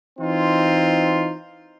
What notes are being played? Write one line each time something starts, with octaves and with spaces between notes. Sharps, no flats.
E3 C4 D#4 F4